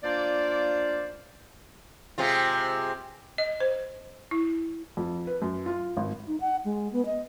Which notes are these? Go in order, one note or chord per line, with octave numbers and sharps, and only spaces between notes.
A#3 D4 F4 C5 D5
C3 G#3 F4
D#5
C5
E4
F2
B4
F#2
F4
G#1
D#4
F#5
G#3
B3
D#5